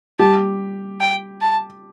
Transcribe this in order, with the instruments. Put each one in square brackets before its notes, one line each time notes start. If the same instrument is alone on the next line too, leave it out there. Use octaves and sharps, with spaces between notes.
[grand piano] G3 G4 [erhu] A5
[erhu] G5
A5